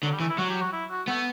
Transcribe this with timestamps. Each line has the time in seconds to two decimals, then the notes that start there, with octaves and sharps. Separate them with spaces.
0.03 D3 F#3
0.12 G3
0.20 E3 A3
0.29 E4
0.38 F#3 F#4
0.50 G4
0.61 F#4
0.73 E4
0.90 F#4
1.07 A3 B3